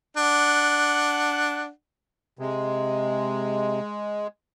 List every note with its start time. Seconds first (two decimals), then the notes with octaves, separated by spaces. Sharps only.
0.17 D4 F#5
2.39 C3 G#3